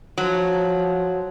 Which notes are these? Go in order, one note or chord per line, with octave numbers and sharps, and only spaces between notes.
F3 F#3